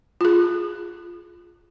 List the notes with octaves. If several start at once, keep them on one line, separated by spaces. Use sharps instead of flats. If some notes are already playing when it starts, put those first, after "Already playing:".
F4 G#4